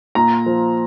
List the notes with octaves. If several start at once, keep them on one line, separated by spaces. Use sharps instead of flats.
A#2 A#5
F3